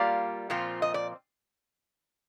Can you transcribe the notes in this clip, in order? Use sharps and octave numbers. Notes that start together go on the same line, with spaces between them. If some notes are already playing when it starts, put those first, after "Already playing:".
Already playing: G3 A#3 F4 D5 F5
A#2 F3 C4 F4
D#5
D5